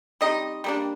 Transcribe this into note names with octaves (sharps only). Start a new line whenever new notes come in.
G3 C4 D#4 D#5
G3 A#3 D4